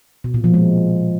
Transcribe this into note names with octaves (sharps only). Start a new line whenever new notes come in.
B2
A#2
F3
G#3